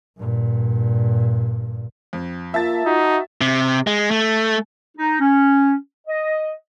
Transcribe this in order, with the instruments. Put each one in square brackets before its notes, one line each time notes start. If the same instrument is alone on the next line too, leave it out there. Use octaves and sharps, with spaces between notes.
[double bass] G2 A#2
[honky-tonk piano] F2
[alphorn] A#3 [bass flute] F4 [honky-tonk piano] E5 A5 A6
[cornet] D#4 [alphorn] F#4
[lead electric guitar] C3
G#3
A3
[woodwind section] D#4
C#4
D#5